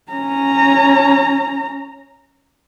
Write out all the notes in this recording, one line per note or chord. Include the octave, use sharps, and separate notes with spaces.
C#4 A#5